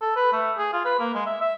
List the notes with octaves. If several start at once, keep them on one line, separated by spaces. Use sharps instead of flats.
A4
B4
A3
G#4
F4
B4
A#3
G#3
E5
E5